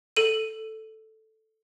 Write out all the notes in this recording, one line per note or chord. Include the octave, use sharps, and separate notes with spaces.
A4 D#7